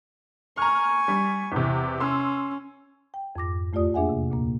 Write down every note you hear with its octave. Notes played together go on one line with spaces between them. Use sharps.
G#5 A#5 C#6 F6
G3
E2 C3
C#4 C6 E6
G5
F2 G#2 D6 A#6
E2 A3 F4 G4 D5 D#6
A#3 D4 G#4 E5 F#5 G#5
C3
D2 A#2 A#3